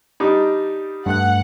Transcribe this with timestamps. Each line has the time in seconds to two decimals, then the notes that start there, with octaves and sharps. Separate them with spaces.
0.20 G3 D4 D#4
1.06 G2 A3 F#5 F#6